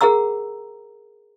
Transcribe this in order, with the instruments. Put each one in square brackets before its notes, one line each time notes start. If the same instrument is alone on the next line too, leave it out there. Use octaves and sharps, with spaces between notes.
[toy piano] G#4 A#4 F#5 A#5 E6